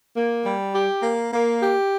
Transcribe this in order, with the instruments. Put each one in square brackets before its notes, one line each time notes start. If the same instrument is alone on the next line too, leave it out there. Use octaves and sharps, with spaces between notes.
[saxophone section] A#3
G3
G4
A#3
A#3
G4